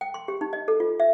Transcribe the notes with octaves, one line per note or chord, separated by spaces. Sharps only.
G5
C6
G4
D#4
D#5
A4
F4
E5